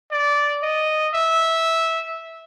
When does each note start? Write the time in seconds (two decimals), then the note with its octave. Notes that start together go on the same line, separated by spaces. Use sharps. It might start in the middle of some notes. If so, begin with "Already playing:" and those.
0.11 D5
0.63 D#5
1.14 E5